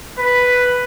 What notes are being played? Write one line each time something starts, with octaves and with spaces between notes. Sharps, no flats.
B4